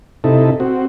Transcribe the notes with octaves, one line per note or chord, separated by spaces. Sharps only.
C3 D#4 E4 A4
C4 F#4